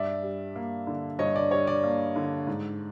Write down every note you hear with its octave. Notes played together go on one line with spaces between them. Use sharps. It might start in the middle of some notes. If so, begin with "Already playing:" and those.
Already playing: G2 D5 E5
G3
A#3
D3
G2 C#5 D#5
D5
G3 C#5
D5
A#3
D3
G#2